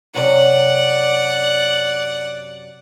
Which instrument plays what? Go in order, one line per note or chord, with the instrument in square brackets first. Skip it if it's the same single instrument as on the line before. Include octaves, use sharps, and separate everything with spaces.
[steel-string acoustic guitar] F#2 C3 C#5 [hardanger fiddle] D5 F#5